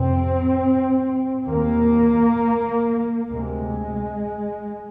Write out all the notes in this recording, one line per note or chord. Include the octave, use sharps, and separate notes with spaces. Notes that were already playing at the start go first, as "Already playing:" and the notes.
Already playing: F2 C3 C4
D#2 A#3
D2 C3 G#3